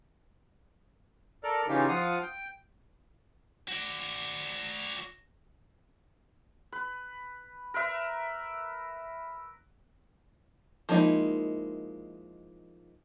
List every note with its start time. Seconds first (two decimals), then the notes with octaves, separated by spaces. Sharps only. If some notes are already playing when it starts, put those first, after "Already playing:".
1.44 A4 A#4 D5 F6
1.68 C#3 E3 C#4 D#4 F4 G4
1.89 F3 F4 F5 F#5 D#6
2.23 G5
3.68 F#4 D5
6.72 B4
7.74 A#4 B4 E5
10.89 F3 G#3 A#3 D#4 E4